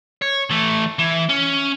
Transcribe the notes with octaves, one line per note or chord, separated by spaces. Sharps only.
C#5
E3 A3
E3
C#4